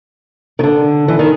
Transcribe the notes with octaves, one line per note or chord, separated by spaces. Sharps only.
D#3
D3
E3
D#3